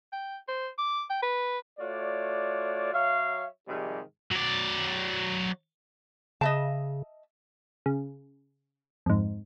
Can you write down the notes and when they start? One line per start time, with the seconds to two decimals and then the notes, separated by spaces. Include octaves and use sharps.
0.13 G5
0.48 C5
0.78 D6
1.10 G5
1.23 B4
1.79 A3 F4 F#4 C#5 D5
2.93 F#3 C#5 E5 F5
3.68 G#2 C3 D#3 F3 G3 G#3
4.31 F#3 D5
6.41 C#3 D#5 E5 A5
7.86 C#3
9.06 F2 G#2